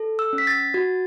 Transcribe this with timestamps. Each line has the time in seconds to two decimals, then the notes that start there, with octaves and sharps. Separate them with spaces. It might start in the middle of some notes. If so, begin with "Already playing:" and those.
Already playing: A4
0.19 E6
0.33 C#4
0.38 B6
0.47 A6
0.74 F#4